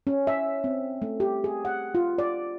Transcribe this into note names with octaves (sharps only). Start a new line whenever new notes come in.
C#4
E5
C4
A3
G4
G#4
F#5
F4
D5